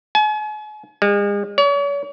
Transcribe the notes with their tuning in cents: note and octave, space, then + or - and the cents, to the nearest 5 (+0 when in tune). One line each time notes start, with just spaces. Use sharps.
G#5 +40
G#3 -40
C#5 +40